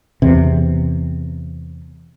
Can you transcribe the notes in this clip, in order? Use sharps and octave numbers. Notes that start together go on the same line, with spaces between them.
E2 C3